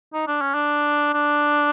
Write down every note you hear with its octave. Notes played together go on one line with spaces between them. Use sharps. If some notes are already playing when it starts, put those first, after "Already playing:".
D#4
D4
C#4
D4
D4